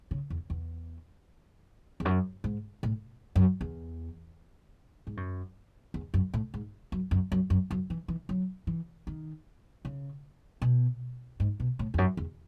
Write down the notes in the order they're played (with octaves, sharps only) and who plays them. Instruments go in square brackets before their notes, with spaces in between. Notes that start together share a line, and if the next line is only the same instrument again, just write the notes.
[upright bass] C#3
E2
E2
E2
F#2
G#2
A2
F#2
E2
G#2
F#2
E2
F#2
A2
G#2
F#2
F#2
F#2
F#2
F#2
E3
E3
F#3
E3
D#3
C#3
B2
G#2
B2
A2
E2
F#2
E2